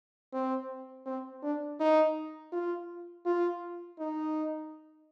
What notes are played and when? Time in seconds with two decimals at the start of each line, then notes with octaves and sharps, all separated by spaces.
0.34 C4
1.06 C4
1.43 D4
1.80 D#4
2.52 F4
3.26 F4
3.99 D#4